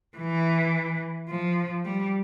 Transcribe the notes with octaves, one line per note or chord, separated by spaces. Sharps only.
E3
F3
G3